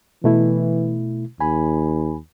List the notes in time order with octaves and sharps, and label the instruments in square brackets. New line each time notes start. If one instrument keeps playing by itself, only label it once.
[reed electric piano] B2 A3 E4 [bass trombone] E3
[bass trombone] D#2 [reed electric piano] G#5 B5